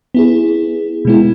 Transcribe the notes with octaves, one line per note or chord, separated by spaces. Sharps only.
B3 E4 G#4
B2 G#3 B3 E4